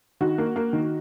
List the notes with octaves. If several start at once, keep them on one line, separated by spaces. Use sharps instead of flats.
D#3 F#4
A#3
A#3
D#3